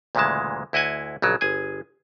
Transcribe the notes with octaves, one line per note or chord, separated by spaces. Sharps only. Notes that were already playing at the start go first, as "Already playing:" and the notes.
D2 A#2 C#3 E3 G#3 A5
D2 E4 D#5 F#5 G#5
A#1 C#3 F#3
G1 G#4 G#5